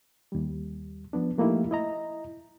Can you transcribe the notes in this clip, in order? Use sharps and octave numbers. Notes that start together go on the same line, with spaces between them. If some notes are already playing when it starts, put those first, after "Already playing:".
D#2 G3
F3 B3 D4
F3 A3 A#3 D#4 E4 G4
E4 D#5 A#5